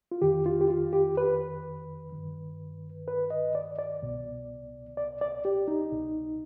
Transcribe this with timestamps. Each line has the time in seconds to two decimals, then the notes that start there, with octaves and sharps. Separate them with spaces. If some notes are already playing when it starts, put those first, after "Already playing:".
0.12 F4
0.22 F2 D#3 G4
0.46 F4
0.61 G4
0.70 F4
0.93 G4
1.17 B4
2.12 G2 D#3
3.08 B4
3.30 D#5
3.55 D5
3.79 D5
4.02 C2 B2
4.97 D5
5.21 D5
5.45 G4
5.68 D#4
5.92 C2 B2